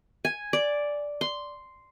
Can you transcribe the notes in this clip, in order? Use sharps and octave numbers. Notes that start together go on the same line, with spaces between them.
G#5
D5
C6